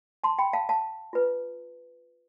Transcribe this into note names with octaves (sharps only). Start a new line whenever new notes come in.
A5 C6
G5 B5
F5 A5
F5 A5
F4 B4